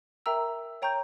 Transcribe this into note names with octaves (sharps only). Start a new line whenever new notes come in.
A#4 E5 G5 A#5 E6
C#5 G5 A#5 C#6 G6